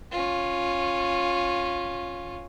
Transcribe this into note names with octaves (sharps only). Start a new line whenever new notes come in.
C#4 F4